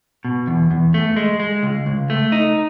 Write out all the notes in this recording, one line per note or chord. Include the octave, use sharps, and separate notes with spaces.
B2
E2
E2
A3
G#3
G#3
C#2
C#2
A3
D#4